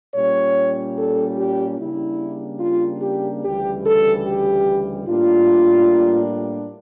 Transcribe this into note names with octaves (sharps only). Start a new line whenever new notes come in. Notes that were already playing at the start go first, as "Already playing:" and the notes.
A#2 G3 C#4 C#5
A4
G4
C#3 G3 A#3 D4 E4
F4
G4
D2 C#3 E3 G3 G4
A4
G4
A2 G3 A#3 D4 F4